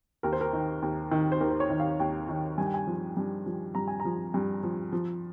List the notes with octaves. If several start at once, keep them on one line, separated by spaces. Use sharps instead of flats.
D#2 A#4
C5
A#4
D#3
D#2
D#3
C5
D#2 A#4
C5
C#5
D#3
F5
D#2 G5
D#3
G2 G#5
G5
G#5
F3
G2
F3
G2 A#5
G#5
A#5
F3
G2
F3
F3